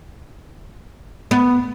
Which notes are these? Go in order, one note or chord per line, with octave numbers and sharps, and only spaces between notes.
B3